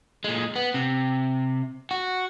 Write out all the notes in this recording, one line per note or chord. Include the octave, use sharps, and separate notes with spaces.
A#2 G#3
B3
C3
F#4